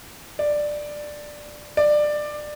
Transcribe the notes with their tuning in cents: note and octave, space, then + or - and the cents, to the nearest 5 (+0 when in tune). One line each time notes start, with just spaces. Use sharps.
D5 +10
D5 +20